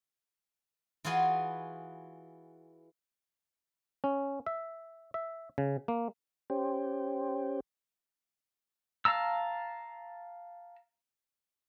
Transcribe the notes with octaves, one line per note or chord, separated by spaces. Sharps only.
E3 F4 F#4 G#4 B4 C6
C#4
E5
E5
C#3
A#3
C#4 G4 C5
F5 A5 A#5 E6